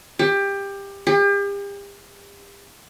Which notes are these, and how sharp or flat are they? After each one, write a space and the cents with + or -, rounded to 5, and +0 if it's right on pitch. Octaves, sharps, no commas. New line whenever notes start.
G4 +20
G4 +40